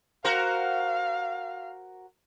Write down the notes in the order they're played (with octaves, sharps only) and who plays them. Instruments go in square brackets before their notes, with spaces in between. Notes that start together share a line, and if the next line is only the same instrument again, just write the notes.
[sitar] F#4 A#4 C5 [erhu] F5